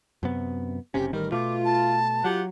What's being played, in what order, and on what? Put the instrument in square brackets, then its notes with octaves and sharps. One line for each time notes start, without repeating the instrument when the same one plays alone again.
[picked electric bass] F#2 C3 B3
[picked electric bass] F#1 C3 C#4 [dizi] G4
[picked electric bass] A1 D#3 G3 [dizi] A#4
[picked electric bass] B2 A3 [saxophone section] F4 [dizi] D6
[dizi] A5
[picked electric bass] F#3 [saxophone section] F4 G4 F#5